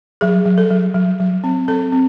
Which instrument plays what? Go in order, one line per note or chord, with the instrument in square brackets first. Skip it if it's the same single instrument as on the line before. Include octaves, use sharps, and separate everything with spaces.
[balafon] F#3 G#4
F#3
A4
F#3
F#3
F#3
C4
C4 A4
C4